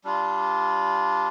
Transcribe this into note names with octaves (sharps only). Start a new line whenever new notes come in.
G3 D4 F4